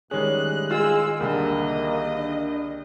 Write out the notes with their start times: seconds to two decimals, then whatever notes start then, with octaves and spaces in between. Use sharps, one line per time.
0.11 A2 D#3 G3 G#3 C#4 G#4 F#6
0.71 G#3 F4 E6
1.20 C2 D3 A#3 D#5
2.17 D4